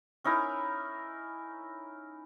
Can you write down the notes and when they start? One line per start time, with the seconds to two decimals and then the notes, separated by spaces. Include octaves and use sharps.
0.24 C#4 D#4 E4 A#4